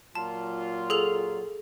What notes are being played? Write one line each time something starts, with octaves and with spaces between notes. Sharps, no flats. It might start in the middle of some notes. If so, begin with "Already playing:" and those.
A#2 F#3 F4 A5
G#4 A4 F7